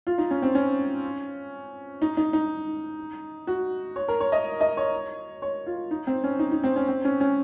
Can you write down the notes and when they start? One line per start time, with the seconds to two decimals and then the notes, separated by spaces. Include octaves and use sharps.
0.07 F4
0.18 D#4
0.31 C#4
0.42 C4
0.55 C#4
2.02 D#4
2.17 D#4
2.33 D#4
3.47 F#4
3.96 C#5
4.08 A#4
4.20 C#5
4.32 D#5
4.61 D#5
4.77 C#5
5.42 C#5
5.67 F4
5.91 D#4
6.07 C4
6.24 C#4
6.39 D#4
6.52 D#4
6.64 C4
6.76 C#4
6.88 C4
7.05 C#4
7.20 C#4